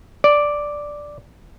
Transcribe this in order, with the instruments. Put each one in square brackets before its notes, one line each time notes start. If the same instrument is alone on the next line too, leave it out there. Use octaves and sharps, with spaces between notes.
[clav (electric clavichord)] D5